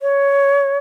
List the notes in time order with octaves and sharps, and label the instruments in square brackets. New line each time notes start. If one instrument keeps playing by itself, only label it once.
[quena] C#5